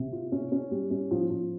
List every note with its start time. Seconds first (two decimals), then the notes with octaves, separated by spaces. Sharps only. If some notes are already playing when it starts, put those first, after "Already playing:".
Already playing: C3
0.13 F4
0.32 C#4
0.52 C#4
0.71 G3
0.91 C#4
1.11 F3
1.30 F3